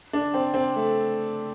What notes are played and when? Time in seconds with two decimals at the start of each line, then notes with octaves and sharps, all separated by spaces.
0.13 D4
0.34 C4
0.54 C4
0.76 A3